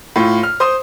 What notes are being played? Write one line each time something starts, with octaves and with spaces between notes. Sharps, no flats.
A2 F4
F6
C5 C6 D#6